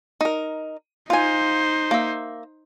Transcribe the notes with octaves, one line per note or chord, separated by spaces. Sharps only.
D#4 A#4
D#4 F4 C5 G#5
A#3 E5